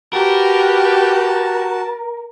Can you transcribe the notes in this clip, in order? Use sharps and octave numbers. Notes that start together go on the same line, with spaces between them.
F#4 G4 A#4 B4 A5